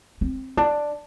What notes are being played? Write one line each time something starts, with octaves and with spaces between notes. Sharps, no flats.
C4
D4